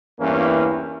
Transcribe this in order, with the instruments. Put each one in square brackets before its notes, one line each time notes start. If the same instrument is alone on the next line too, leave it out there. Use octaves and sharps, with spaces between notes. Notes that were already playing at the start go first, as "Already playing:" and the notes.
[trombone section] E2 G2 E3 A#3 C#4